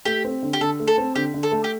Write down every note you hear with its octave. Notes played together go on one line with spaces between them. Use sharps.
A3 G4
C4
D3
G4
D3 A4
A3
A4
C4
D3 G4
D3
A4
A3
G4